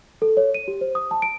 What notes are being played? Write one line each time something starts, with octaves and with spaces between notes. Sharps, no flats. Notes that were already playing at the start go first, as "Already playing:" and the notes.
A4
C#5
D#7
G4
C5
D#6
A5
D7